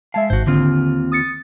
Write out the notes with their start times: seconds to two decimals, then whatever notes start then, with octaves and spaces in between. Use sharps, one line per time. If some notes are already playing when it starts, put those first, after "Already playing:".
0.14 G#3 E5 F5 A5
0.30 G#1 G#2 F#4 C5
0.47 D#2 D3 C4 F4
1.12 D#6 A6 C#7